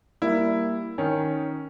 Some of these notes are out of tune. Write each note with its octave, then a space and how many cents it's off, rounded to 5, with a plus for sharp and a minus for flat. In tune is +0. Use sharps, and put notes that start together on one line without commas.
G3 +0 A#3 +0 E4 +0
D#3 +0 C#4 +0